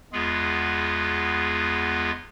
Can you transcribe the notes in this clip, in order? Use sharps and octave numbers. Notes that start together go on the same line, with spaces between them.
E2 G#3 B3 F4 G#4